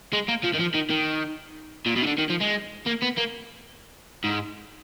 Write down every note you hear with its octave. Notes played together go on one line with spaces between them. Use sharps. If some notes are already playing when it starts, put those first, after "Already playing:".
G#3
A#3
F3
D#3
F3
D#3
D#3
A#2
B2
D#3
D3
D#3
F3
G#3
A#3
B3
A#3
G#2